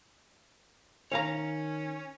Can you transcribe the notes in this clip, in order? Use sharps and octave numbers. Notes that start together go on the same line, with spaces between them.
D#3 C#4 C#5 F5 A#5